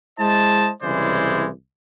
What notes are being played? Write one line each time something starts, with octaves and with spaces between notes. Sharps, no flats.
G#3 E4 C5 D#5 A5
C2 C#3 E3 G#3 C5 D5